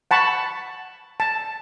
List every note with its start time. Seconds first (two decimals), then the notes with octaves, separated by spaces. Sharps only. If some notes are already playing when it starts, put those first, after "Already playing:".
0.11 F#5 A5 B5 C#6
1.20 A5